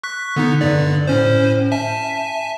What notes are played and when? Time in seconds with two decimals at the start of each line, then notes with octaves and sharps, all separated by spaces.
0.03 C#6 F#6 B6
0.36 D3 B3 D#4
0.61 G2 D3 D5
1.07 A2 C#4 C5
1.72 E5 G#5 A5